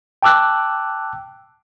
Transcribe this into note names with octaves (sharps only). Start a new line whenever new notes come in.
G5 A5 D6 E6 F#6